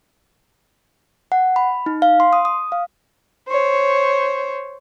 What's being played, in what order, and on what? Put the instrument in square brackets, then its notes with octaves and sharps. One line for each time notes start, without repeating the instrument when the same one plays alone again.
[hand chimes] F#5
B5
D#4
F5
C6
D#6
D#6
F5
[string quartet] C5 C#5